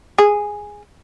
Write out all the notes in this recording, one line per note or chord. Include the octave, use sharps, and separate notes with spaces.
G#4